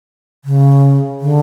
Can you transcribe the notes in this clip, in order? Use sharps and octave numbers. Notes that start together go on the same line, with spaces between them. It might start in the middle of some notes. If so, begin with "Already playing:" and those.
C#3
D3